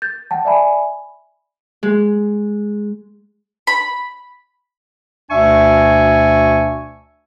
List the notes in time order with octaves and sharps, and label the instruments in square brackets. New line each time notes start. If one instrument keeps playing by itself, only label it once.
[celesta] G6 A6
F#5 G5 A5
D5 E5 G#5 B5
[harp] G#3
[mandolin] B5
[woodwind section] D2 B2 D4 E5 G#5 C#6